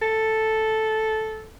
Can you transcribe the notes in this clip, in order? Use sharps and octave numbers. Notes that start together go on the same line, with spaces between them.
A4